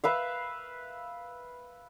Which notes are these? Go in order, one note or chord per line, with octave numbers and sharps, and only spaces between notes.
B4 E5 F5